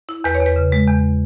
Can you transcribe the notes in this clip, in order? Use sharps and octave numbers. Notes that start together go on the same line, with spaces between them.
E4
E2 B4
C#5
E2
B4
C#3
G#3
E2